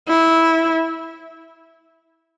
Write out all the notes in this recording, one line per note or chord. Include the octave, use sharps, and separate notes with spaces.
E4